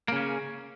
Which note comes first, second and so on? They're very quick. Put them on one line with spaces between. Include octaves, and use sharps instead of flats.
A#3 C#3 C#4